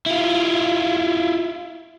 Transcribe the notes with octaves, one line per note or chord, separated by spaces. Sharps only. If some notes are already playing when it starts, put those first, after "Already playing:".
E4 F4